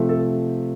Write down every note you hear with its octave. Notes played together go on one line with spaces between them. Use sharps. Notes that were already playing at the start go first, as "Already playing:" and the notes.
Already playing: C3 F3 A3
A4